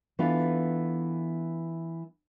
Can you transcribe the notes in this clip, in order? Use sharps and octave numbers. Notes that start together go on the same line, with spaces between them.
E3 B3 D4 F4 A4